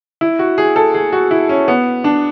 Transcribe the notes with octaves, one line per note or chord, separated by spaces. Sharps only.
E4
F#4
G#4
A4
G#4
F#4
E4
C#4
B3
D4